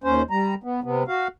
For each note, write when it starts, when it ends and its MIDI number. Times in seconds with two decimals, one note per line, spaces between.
0.04 0.22 39
0.04 0.22 61
0.04 0.22 72
0.30 0.54 55
0.30 0.54 82
0.64 0.80 59
0.84 1.03 48
0.84 1.03 59
1.08 1.28 66
1.08 1.28 77